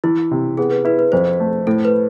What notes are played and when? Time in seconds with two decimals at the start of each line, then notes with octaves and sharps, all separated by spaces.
0.04 E3 E4
0.31 C3
0.57 B3 G#4
0.71 B4
0.85 E4 B4
0.99 B4
1.12 F2 C5
1.40 A3
1.67 A2 A4
1.85 B4